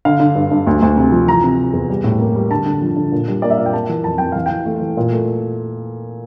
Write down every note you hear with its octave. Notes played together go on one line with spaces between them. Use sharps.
D3 F5
D3
G2
G2
D2
D2
C3
F3
E3 A#5
C3
C3
E2
G3
A2
A#3
G3
D3 A5
D3
F3
D3
A#2
G3
A#3 D5
E5
A#2 F5
G5
A#3 A5
E3
F2 A5
F2 G5
E3 F5
E3 G5
A3
E3
A#2
A3